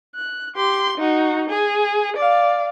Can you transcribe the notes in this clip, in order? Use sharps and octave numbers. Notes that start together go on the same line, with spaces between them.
F#6
G4 C6
D#4 F#4
G#4
D5 F5